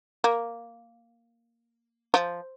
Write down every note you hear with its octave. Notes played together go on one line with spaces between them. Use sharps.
A#3
F3